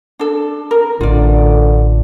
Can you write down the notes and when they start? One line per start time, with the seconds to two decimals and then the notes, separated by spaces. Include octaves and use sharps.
0.19 D4 A4
0.71 A#4
1.01 A1 D3 F4 D5